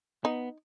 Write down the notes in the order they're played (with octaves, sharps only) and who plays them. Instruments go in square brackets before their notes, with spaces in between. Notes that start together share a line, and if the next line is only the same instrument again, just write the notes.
[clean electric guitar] B3 [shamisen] D#4